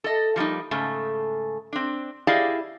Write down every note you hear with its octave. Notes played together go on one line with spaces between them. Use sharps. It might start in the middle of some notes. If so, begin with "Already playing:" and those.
A4 D#5
F3 G3 A#3 D#4
G#2 C#3 A3
C4 D4
E4 G4 G#4 D5 D#5 F5